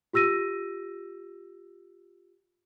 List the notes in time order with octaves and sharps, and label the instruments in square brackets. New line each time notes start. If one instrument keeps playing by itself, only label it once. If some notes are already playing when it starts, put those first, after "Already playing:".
[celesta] F4 G4 E6 A#6 D#7